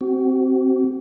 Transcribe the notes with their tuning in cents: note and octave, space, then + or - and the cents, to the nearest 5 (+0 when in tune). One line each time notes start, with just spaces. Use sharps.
C4 +0 F#4 +35